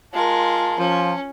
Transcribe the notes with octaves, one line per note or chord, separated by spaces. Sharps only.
G#3 F4 A#4 A5
F3 C#4